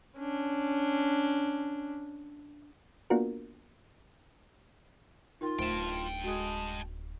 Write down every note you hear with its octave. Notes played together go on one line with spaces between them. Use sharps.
C#4 D4
A#3 B3 D4 F4 F#4 A#4
D#4 F4 A#4 G5
D1 A3 C5 E5 G5 A5
G#3 F#4 A4